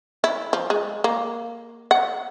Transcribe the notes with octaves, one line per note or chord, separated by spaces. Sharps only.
E4
F3
G#3
A#3
F#5